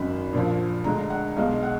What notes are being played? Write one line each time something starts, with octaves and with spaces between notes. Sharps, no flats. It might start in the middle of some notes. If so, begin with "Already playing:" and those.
Already playing: G#1 F#2 D#3 F#3 B5
A#1 A#2 F3
D2 D3 G#3 A#5
F#5
B1 B2 G#3 F5
F#5